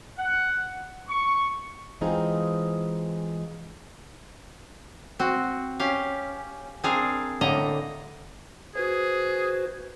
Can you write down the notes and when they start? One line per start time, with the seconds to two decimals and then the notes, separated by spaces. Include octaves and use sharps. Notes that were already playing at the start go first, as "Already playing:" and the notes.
0.18 F#5
1.08 C#6
2.01 E3 G#3 C4 D#4 F4 G#4
5.19 C4 F#4
5.80 C#4 G4 F5
6.84 C4 D4 G#4 A#4 F5
7.41 A2 D3 A#3 D#5 A#5
8.76 F#4 G#4 B4 C5